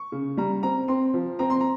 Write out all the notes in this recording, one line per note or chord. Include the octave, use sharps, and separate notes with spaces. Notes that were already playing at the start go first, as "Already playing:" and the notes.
Already playing: C#6
C#3
G3 A#5
C4 A#5
C4 C6
F3
C4 A#5
C6
A#5